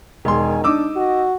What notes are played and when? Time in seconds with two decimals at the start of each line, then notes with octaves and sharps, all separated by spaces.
0.25 E1 D#3 G#5 C6
0.64 D4 D#4 D6 E6
0.96 F#4 D#5